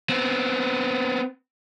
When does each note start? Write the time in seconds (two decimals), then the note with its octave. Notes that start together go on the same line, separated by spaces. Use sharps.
0.10 B3 C4